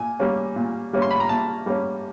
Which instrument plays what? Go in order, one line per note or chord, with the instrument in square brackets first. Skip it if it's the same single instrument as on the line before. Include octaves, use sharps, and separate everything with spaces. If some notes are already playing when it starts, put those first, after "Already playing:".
Already playing: [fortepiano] A#2 G#5
G3 A#3 C#4
A#2
G3 A#3 C#4
C6
B5
A#5
A#2 A5
G3 A#3 C#4